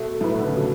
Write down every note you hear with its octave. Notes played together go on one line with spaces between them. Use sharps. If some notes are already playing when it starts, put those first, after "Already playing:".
Already playing: B2 A3
A2 E4 B4
D3
C#3
B2 A3